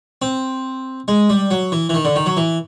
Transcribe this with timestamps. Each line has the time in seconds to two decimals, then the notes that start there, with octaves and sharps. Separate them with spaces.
0.22 C4
1.08 G#3
1.30 G3
1.51 F#3
1.72 E3
1.89 E3
1.94 D#3
2.05 D3
2.16 D#3
2.26 F#3
2.37 E3